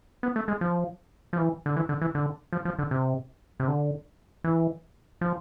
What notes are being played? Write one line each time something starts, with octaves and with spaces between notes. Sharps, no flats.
B3
A3
G#3
F3
F3
E3
D3
E3
D3
E3
D3
F3
F3
D3
C3
C3
D3
E3
F3